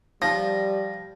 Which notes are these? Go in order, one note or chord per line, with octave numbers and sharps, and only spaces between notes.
F3 G3 A#6